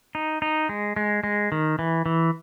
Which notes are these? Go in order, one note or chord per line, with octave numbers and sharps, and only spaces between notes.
D#4
D#4
G#3
G#3
G#3
D#3
E3
E3